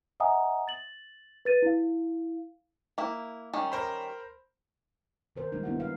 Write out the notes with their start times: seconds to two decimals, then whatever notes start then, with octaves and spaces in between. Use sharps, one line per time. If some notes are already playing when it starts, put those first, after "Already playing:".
0.20 D#5 E5 F#5 G#5 A#5 D#6
0.68 A6 F#7
1.45 B4 A6 D#7
1.62 E4 F5
2.98 A#3 E4
3.53 D#3 G3 C#4
3.72 A#4 C5 B5
5.36 D#3 A#4 C5
5.52 D#3 F3 G3 G#3 A#3 D#4
5.63 D#3 B3 D4 E4 F#4 F#5
5.76 D3 G3 F5